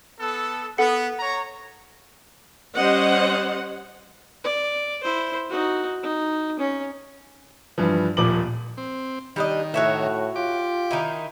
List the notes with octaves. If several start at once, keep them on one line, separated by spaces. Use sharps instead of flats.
B3 A4
B3 A4 F#5 C#7
C#5 A#5
G3 C#4 C5 D#5 F#5
D5
E4 C5
D#4 F#4
D#4
C#4
G2 E3 F3
D#1 A#2 F3 D6 F#7
C4
D#3 G3 D4 D#5
A2 F#4 C#5 E5
F4 G4 D6
D#3 D#4 E4